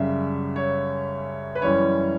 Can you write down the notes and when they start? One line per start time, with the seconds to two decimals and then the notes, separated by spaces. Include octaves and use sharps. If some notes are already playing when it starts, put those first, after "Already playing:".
Already playing: F#2 C#3 G3 E5
0.56 C#5
1.55 B4
1.62 F#2 E3 G3 C#4 E4 C#5